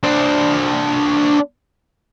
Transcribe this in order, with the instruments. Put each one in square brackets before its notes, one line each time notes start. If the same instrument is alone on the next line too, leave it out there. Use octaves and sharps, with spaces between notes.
[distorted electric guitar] D4 C5